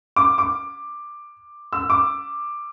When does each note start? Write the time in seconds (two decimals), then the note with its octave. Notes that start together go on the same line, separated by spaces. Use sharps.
0.16 D6
0.38 D6
1.73 E6
1.90 D6